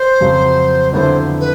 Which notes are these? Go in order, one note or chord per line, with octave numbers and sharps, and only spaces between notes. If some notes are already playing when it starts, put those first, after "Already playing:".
Already playing: C5
F2 C#3 F#3
F2 D3 F#3 B3 E4 C5 C#5
B4